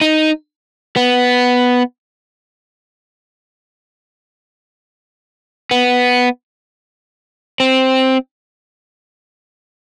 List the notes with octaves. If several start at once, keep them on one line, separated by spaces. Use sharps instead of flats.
D#4
B3
B3
C4